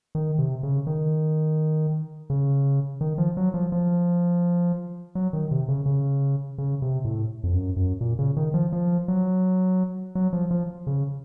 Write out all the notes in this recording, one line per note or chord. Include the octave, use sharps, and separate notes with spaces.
D#3
C3
C#3
D#3
C#3
D#3
F3
F#3
F3
F3
F#3
D#3
C3
C#3
C#3
C#3
C3
A2
F2
F#2
F#2
A#2
C#3
D#3
F3
F3
F#3
F#3
F3
F3
C#3